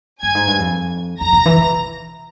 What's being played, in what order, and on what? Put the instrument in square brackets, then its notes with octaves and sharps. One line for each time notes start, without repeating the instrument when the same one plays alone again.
[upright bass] G2 [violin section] G#5 G#6
[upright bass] G#2
G2
F2
[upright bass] F2 [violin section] A#5 A#6
[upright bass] C3
E3
C3